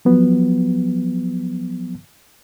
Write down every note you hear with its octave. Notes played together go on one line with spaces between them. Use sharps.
F3 F#3 B3